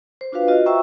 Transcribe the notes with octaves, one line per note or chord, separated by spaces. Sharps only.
C5
D4 F4 F#4 B4 F5
F4 F#4 D#5
C5 E5 G5 A#5 C#6 E6